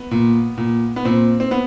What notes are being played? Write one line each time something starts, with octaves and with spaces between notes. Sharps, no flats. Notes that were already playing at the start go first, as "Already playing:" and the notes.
Already playing: B3
A#2
A#2
B3
A#2 C4
C4
B3